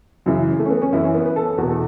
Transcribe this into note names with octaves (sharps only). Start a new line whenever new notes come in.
F#2 C#3 E3 F#3
A3
C#4
B3
C#4
F#2 E3 E4
C#4
B3
B4
A4
E2 B2 F#4
A4